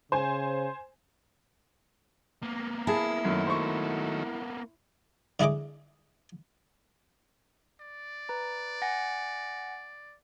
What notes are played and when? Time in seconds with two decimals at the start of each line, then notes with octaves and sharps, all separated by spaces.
0.12 C#3 C5 G#5
2.43 A#3 B3
2.87 E4 G#4 A5
3.25 F#2 D#3 F#3 A3
3.47 C5 C#6
5.40 D3 E4 G#4 D#5 D6
7.81 D5
8.29 B4 A#5
8.82 F#5 G#5 A#6